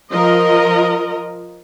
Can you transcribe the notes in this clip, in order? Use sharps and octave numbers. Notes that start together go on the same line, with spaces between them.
F3 A#4 D#5